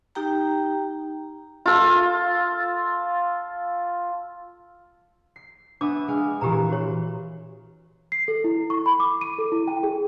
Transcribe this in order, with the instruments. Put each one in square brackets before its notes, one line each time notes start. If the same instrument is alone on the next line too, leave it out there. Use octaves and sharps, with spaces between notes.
[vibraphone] D#4 G4 G5 A#5
[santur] F4 A4
[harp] C7
[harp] B3 E5 D#6 [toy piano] D4 D6
[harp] G#3 F5
[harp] A#2 E3 [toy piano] G4 B4 A#5
[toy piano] F#4 C#5
[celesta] C7
A4
E4
C#6
B5
D6
D#7
A4
E4
G5
G#4